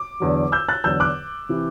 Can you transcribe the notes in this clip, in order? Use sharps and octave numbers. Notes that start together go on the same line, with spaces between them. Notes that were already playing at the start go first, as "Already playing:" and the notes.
Already playing: D6
E2 D3 F#3
E6 G6
F#6 A6
E2 D3 F#3 E6 G6
D6 F#6
C3 E3